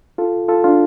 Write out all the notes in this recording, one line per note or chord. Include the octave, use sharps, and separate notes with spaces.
F4 A4
F4 A4
D4 F4